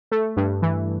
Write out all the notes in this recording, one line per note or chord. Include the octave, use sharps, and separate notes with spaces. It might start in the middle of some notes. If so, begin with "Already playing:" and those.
A3
G2
E3